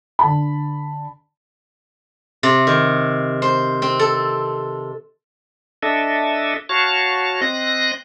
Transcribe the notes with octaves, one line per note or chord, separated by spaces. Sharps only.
D3 A5 B5
C3
D#3
C5
C4
A4
D4 A4 D#5 E5
F#4 C#5 F5 A5
C4 D#5 F#6 A#6